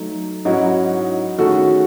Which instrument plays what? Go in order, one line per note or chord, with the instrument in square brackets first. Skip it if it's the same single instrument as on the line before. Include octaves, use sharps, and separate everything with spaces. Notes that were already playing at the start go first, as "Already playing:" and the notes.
Already playing: [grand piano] F#3 A3 D#4
[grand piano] G#2 F#3 C#4 E4 [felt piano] D#4 F#4
[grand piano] D#3 A3 C#4 G#4 [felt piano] F#4 A4